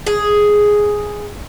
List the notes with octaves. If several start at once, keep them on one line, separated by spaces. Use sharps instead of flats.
G#4